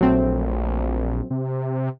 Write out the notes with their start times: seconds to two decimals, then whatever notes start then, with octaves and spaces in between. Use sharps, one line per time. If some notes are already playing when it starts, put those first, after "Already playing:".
0.01 A#1 F#3 A3 C4
1.30 C3